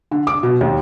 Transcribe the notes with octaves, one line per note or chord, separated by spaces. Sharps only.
D3
D6
B2
D#2